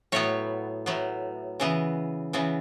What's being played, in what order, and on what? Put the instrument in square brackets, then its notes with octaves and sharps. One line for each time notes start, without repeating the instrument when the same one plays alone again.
[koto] A2 F#3 B3 C#5
A2 F#3 B3
C#3 E3 B3
C#3 E3 B3